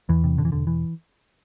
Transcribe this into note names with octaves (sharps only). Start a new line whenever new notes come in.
E2 E3
C3
E1 D3
E3
E1 D3
E3